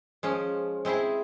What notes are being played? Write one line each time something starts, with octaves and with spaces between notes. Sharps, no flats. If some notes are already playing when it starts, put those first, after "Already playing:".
F3 G#3 C#4
G#3 C4 E4 G#4